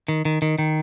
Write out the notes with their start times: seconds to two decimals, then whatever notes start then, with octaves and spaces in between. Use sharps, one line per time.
0.08 D#3
0.25 D#3
0.42 D#3
0.59 D#3